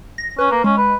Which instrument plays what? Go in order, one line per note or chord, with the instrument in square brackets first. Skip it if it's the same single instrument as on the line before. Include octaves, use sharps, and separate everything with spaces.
[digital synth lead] A#6
[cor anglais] C#4 [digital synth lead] B4
[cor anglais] A#3
[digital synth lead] G#3 [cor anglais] C#4
[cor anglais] B4